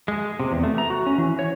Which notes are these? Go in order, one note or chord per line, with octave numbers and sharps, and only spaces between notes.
G#3
C3
E2
A3
A#5
F#4
C#4
E3
C#5